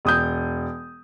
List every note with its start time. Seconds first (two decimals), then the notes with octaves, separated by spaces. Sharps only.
0.05 E1 D#6 G6